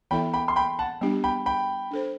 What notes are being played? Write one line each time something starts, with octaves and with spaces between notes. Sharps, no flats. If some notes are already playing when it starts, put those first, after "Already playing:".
E3 B3 E4 A4 E5 G5 B5
G5 B5
C6
G5 B5
F#5 A5
G3 B3 D4 G4
G5 B5
G5 B5
D4 A4 C5